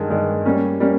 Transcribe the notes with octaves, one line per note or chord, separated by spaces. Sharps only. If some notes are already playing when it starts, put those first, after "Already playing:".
Already playing: G2 D#3 G#3
G2 D#3 G#3
G3 A#3 C#4
G3 A#3 C#4